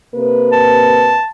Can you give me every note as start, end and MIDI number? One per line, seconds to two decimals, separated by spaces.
0.15 1.18 48
0.15 1.18 58
0.15 1.18 71
0.52 1.29 81